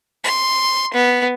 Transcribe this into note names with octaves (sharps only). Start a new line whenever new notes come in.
C6
B3